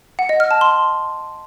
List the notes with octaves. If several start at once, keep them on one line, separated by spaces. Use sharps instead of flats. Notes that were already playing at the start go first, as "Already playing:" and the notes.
F#5
D#5
F6
A5
C6